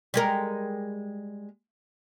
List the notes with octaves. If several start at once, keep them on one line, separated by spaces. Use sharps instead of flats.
G3 G#3 A#4